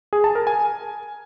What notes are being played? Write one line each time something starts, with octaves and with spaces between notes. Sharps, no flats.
G#4
A5
A#4
G#5